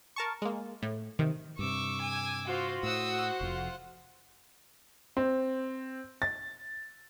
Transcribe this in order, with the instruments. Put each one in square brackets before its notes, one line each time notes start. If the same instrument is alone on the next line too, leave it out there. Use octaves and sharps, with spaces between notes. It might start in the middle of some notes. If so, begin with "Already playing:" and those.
[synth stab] A#4 A5 C#6
G#3 A#3
A2
C3 D#3
[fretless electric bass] G2 C3 [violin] C#6 [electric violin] D6 E6
[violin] G#5
[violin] F4 C5 [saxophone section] F#4
[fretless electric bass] A2 [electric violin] C5 F#5 [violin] D#6 E6
[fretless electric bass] F1 F2 [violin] F4
[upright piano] C4
A6